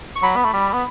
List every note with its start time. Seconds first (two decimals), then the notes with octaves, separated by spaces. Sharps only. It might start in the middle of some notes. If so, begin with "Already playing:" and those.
0.15 C#6
0.22 F#3 B5
0.36 B3
0.44 A3
0.53 G3
0.73 B3